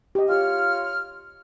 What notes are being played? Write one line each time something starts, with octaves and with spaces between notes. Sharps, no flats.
G4 D#5
F4 G4 C#5 F5 F6